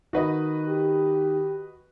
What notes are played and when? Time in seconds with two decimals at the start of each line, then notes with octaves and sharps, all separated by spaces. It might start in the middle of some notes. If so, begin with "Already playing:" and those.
0.13 D#3 F#4 B4 D#5
0.69 G4